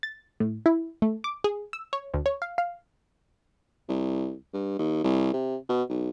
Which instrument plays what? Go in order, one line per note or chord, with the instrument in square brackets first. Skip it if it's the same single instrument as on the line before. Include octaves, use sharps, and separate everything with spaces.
[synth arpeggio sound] A6
A2
E4
A3
D6
G#4
E6
C#5
D2
C#5
F5
F5
[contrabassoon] C2
G2
D#2
C2
C3
B2
B1